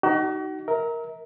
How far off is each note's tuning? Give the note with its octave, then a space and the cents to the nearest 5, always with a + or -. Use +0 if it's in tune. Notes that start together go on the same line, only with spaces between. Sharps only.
D#4 +0 F#4 +40
A#4 +0 E5 -40